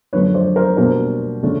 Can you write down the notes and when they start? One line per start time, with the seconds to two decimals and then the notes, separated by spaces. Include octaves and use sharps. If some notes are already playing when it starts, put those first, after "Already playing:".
0.13 F#2 D3 F3 A3 B4 C#5
0.34 C5 D5
0.56 A#4 C5
0.77 B2 G3 A#3 D4 A#4 C5
1.43 C#3 F3 A3 D4